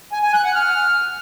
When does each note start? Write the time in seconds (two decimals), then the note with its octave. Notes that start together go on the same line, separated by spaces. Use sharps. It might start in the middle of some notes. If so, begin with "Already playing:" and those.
0.12 G#5
0.23 G#5
0.34 F#6
0.44 F#5
0.55 F6